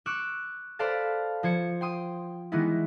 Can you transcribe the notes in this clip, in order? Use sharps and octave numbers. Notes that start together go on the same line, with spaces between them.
C#6 D6 E6 F#6 G6 C#7
A4 B4 C5 D5 F5 A5
F3 C5 G#6 C#7
G5 C6 D#6
D#3 E3 G#3 B3 E4